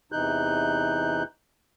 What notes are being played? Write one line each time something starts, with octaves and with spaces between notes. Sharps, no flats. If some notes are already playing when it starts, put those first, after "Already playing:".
E2 C3 E3 D#4 F#6 G6